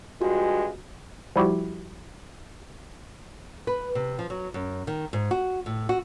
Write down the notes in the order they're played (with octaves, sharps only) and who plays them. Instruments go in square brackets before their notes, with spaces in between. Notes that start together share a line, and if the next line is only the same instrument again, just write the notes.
[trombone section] G2 G#3 [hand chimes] F4 F#4
[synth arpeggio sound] F3 G3 E4 F#4 G4
[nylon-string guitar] B4
C3
F3
F#3
F#2
D#3
G#2
F#4
A2
F#4